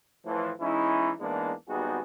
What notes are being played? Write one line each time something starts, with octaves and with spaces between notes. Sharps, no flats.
A2 E3 F3
E3 G#3 C#4 D#4 E4
E2 G#2 E3 G#3 A#3 D4
G#1 G3 B3 D#4 F#4 G#4